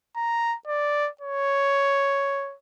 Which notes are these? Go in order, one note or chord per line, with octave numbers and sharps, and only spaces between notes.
A#5
D5
C#5